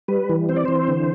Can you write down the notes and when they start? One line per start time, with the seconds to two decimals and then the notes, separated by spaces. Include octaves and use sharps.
0.08 G3 B4
0.29 E3
0.49 C4 C5
0.57 D5
0.65 E3 C5
0.88 D3